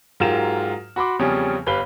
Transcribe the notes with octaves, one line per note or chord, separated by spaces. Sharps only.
G#2 F#3 F4 G4 A#4 E7
F#4 B5 C6 D6
E2 C#3 F3 G3 C4 C#4
G1 G3 B4 F5 B5 G7